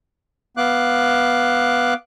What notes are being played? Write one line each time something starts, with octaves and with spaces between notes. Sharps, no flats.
B3 F5 D6 F#6